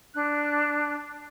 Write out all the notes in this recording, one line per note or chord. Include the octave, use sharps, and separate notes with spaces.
D4 F#6